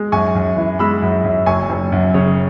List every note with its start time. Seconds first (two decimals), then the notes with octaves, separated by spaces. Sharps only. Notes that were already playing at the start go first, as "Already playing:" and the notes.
Already playing: G#3
0.12 F#2 G#5 C#6
0.35 F#2
0.57 E3
0.79 G#3 B5 E6
1.02 F#2
1.24 F#2
1.46 F#1 G#5 C#6
1.69 F#1
1.92 F#2
2.14 C#3 C#5